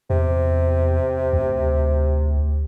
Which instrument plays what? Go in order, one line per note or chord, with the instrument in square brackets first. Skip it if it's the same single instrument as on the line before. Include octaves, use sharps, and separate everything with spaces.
[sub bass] E2 [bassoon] C3
[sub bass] D2